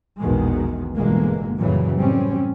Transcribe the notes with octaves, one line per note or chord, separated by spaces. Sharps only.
A#1 E2 B2 D#3 G#3
G1 B2 D3 E3 G#3 A#3
F#2 A#2 C#3 E3 F#3 G3
A2 G3 C4 C#4